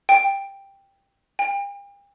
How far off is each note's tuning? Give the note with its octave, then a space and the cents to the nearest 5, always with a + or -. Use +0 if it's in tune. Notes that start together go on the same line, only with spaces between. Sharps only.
G5 +10
G5 +45